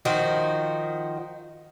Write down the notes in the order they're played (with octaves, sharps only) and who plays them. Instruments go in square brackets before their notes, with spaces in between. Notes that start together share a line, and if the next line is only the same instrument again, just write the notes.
[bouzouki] D#3 F3 F#4